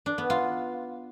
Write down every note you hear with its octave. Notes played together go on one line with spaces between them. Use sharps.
D4
B3
F4